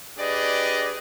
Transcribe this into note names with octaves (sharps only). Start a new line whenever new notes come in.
D4 G4 G#4 B4 D5 D#5